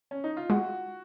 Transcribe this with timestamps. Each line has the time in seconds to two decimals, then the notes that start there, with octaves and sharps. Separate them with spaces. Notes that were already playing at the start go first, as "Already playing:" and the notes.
0.11 C#4
0.24 D#4
0.37 F4
0.50 G#3 F#4